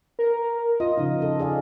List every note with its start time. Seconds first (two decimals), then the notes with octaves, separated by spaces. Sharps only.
0.19 A#4
0.80 F4 D#5
0.97 C#3 F3 D#4
1.22 A4
1.40 G#4 D5 F5